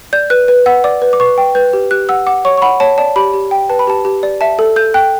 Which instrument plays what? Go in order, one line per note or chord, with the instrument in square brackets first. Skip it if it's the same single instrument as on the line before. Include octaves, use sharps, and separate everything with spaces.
[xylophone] D5 G6
B4 F#6
B4
F#5 E6
D5 D6
B4
D6
B4 C#6
G5
B4 G6
G4
G4 F#6
F#5 E6
F#5 D6
C#5 C#6
C#6
F#5 B5
C#5 A5
D5 A5
G4 B5
G4
G5
B4 A5
B5
G4 A5
G4
D5
E5 A5
A4
A4 G6
G5 F#6